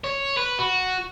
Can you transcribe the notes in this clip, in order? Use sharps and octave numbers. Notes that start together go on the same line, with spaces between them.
C#5
B4
F#4